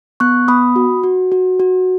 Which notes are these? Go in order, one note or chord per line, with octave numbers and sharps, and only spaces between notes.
B3 C#6 F#6
B3 B5 D#6
F#4
F#4
F#4
F#4